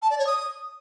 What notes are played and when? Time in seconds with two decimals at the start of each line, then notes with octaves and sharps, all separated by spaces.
0.02 A5
0.10 D5
0.19 C#5
0.27 D#6